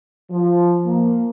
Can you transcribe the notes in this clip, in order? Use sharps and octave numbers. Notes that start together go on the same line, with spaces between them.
F3
A#3